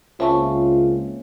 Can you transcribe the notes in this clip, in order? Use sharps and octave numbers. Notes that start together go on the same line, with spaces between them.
C#2 A#3 C4 C#4 F4 E5 A5 C#6